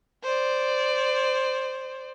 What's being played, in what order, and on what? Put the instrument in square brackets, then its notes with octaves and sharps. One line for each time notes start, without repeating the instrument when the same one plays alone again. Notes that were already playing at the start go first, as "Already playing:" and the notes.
[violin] C5 D5